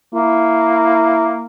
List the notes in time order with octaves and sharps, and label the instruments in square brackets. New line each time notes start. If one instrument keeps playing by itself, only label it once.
[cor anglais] A#3 [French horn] E4